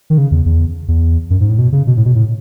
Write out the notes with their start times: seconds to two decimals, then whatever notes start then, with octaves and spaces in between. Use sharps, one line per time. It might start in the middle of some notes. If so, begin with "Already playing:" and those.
0.10 D#3
0.18 C#3
0.31 E2
0.45 E2
0.88 E2
1.30 F#2
1.40 G#2
1.49 A2
1.59 B2
1.72 C#3
1.87 B2
1.97 A2
2.05 B2
2.15 A2